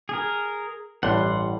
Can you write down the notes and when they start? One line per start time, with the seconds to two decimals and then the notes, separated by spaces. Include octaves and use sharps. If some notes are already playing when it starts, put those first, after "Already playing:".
0.09 G#4 A#4
1.03 A1 G2 G3 F#5 C6